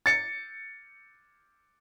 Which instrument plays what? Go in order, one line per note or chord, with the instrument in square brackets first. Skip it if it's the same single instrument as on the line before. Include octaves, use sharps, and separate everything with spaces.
[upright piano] A6 C#7